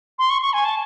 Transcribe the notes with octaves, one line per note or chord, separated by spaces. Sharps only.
C6
C#6
C#6
G#5
A5